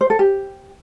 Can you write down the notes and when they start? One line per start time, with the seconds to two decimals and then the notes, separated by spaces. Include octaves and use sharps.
0.01 C5
0.10 A4
0.19 G4